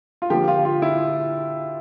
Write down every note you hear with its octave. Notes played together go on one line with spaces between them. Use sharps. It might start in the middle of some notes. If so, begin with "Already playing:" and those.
F4
D3 F3 A#3 G4
F4
F4
E4